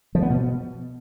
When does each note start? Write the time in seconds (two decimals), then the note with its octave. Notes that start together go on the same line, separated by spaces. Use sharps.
0.15 F3
0.22 B3
0.30 B2